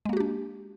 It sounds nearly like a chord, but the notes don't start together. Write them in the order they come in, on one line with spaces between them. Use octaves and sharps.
G#3 A#3 F#4 G4 D4